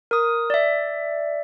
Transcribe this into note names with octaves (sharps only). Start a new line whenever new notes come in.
A#4 D#6
D5 E5